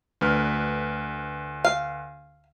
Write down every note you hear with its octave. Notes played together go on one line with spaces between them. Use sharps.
D2 B4 F6
F5